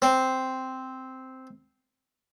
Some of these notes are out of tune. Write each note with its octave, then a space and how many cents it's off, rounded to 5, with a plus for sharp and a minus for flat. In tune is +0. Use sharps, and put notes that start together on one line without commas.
C4 -5